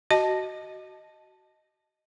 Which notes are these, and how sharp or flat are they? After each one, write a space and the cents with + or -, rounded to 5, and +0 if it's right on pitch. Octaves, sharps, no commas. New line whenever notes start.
F#4 +15 D#5 +0 A5 +0